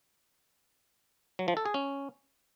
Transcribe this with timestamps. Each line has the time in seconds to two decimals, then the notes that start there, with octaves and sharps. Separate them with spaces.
1.39 F#3
1.48 F3
1.57 A4
1.66 G#4
1.74 C#4